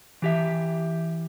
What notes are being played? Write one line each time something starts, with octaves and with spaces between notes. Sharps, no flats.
E3 G4 E5